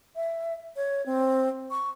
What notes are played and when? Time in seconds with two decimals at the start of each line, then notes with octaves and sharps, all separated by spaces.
0.16 E5
0.76 C#5
1.06 C4
1.71 C#6